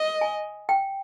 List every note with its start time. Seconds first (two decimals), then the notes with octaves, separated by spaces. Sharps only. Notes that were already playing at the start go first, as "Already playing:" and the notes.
Already playing: D#5
0.21 G#5
0.69 G5